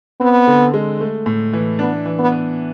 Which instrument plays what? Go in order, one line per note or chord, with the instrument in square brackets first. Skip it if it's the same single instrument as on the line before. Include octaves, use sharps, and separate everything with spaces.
[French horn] B3 [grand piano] C4
[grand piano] D3
G#3
A3
A2
E3
[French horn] B3 [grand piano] D4
[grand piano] E3
[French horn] B3
[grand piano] B3